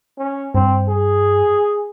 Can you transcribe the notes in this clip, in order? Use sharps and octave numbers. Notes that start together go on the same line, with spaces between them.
C#4
G2 C4
G#4